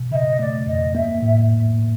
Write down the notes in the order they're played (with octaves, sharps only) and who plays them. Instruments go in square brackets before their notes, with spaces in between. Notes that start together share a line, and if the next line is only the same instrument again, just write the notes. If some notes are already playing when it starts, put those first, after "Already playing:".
Already playing: [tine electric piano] B2
[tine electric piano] C#3 [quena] D#5 E5
[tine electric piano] A3 [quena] D5
[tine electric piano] F2 [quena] D#5
[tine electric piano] A#3 [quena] E5
[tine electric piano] A2